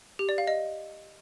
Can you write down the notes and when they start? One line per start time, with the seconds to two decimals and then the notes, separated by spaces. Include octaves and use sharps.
0.19 G4
0.29 D5
0.38 F5
0.47 D#5